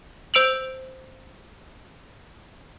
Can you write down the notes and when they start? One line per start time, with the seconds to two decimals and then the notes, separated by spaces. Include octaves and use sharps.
0.34 C5 E6 D7 F7 F#7